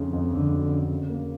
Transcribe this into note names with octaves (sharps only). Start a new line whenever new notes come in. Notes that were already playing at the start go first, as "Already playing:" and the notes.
Already playing: F2 C#3
F2
F2 D3
F#3
C#3
C#3
A#3